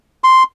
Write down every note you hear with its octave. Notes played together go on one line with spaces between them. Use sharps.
C6